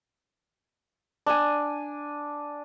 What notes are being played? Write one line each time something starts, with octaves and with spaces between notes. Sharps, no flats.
D4 G#5